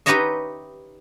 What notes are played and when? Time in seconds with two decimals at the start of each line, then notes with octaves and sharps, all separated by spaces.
0.06 D#4 G4 B4 C#5 D#5 E5